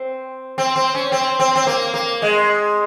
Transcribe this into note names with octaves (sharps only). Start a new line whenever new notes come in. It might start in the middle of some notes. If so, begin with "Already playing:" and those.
Already playing: C4
C4
C4
C#4
C4
C4
C4
A#3
A#3
G#3